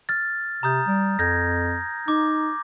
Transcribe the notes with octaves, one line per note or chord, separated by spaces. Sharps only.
F6 A6
C3 A#5 D#6 G6
G3
F2 G6 G#6 A#6
D#4 D6